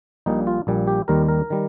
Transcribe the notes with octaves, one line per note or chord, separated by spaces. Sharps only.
A#1 A#2 G3 D#4
F4
A#1 A#2 G3
G4
D#2 D#3 G3 A#4
A#4
D#3 G3